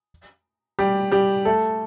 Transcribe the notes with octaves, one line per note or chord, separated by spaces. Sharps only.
G3 G4
G3 G4
A3 A4